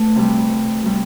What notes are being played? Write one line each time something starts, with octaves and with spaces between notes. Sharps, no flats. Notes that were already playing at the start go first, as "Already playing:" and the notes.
Already playing: A3 B4
C3 G3
C3 G3